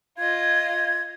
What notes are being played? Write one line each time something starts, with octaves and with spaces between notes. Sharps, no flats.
F4 D#5 G#6